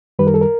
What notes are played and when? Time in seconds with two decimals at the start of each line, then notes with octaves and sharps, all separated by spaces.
0.19 F#2 D#3 G3 B4
0.27 A#4
0.34 A4
0.41 A#4